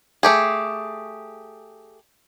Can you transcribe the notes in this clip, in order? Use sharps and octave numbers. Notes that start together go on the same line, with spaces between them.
A3 G4 G#4